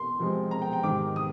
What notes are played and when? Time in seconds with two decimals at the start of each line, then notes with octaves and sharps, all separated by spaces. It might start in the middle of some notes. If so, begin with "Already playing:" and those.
Already playing: C6
0.19 C3 F3 G#3 C4
0.51 A#5
0.62 G5
0.73 G5
0.83 G#2 D#3 G3 D6
1.16 D#6